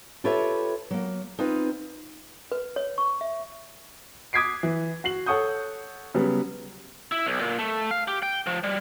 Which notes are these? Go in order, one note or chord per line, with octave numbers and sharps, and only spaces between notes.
F4 G4 A4 B4 C#5 E5
F#3 A#3
C4 D#4 F4 B4
B4
C#5
C#6
E5
D6 D#6 G#6 B6 C7 D7
E3
F#4 C7 F#7
A4 C#5 F#5 C#6 D#6 G6
C#3 F#3 G3 B3
E4
B1
A#2
A3
F5
G4
G5
F3
G3